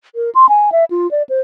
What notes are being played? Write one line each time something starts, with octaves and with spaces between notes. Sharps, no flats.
A#4
C6
G#5
E5
F4
D5
C5